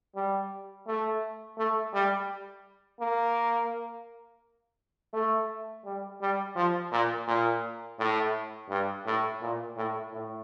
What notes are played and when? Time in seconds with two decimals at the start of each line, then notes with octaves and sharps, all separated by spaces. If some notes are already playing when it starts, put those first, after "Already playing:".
0.15 G3
0.87 A3
1.58 A3
1.94 G3
3.00 A#3
5.13 A3
5.85 G3
6.21 G3
6.56 F3
6.92 A#2
7.28 A#2
7.99 A2
8.69 G2
9.06 A2
9.42 A#2
9.76 A2
10.13 A2